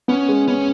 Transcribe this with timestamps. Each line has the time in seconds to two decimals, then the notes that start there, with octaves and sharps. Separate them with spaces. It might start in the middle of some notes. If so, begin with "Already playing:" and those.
0.08 B3 C#4
0.29 G#3
0.48 B3 C#4